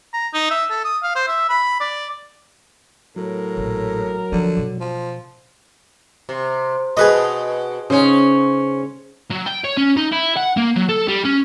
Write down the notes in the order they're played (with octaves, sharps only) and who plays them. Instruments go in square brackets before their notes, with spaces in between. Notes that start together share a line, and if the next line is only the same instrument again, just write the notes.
[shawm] A#5
D#4
E5
A4
D#6
F5
C5
E5
B5
D5
[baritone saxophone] A2 [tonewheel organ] F#3 [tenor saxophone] A#4
[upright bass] A1 A#2
[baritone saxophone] D3 [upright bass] F3
[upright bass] B2
[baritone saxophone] F3
[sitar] C3
[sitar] B2 [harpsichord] G#4 B4 D#5
[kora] C#3 D#4 [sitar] C#4 C5
[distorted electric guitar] F#3
G5
C#5
C#4
D#4
E4
F#5
A#3
F#3
A4
G3
C#4